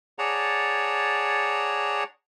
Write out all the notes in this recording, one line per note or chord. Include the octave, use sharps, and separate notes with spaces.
G#4 C#5 D5 F#5 A5 A#5